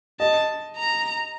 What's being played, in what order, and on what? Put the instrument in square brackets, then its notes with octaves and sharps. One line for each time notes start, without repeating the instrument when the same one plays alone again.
[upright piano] D#5 [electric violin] A5
[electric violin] A#5